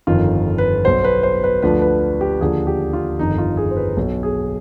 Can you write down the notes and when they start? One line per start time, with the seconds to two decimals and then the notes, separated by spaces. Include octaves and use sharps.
0.07 G1 F2 D#3 F4
0.58 B4
0.85 B1 B2 C5
1.04 B4
1.23 C5
1.44 B4
1.62 D2 D3 F3 B4
1.82 B4
2.21 G4
2.41 D#2 D3 F3 G#4
2.67 G4
2.93 F4
3.19 G1 F2 D#3 D#4
3.38 F4
3.57 G#4
3.71 C5
3.77 B4
3.97 B1 B2
4.23 G#4